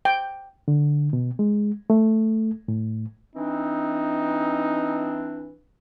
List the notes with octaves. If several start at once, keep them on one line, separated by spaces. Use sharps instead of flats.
G5
D3
B2
G#3
A3
A2
E3 C4 D4 D#4